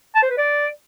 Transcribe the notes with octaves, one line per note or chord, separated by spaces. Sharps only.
A5
C5
B4
D5